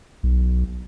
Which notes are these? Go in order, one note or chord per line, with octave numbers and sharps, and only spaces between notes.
B1